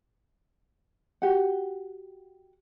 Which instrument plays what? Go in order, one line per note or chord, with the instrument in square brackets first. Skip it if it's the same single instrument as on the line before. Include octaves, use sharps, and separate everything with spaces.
[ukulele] F#4 G4 F#5